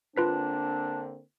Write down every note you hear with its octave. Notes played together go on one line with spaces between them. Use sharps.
D3 A#3 C4 D4 F4 B4 B6